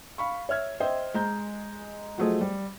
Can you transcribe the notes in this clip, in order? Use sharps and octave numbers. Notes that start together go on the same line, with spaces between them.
F5 B5 C#6
C#5 E5 F6 G#6
C5 D#5 E5 G5
G#3 A#5 G6
F3 F#3 A3 G#4 C5 D#5
G3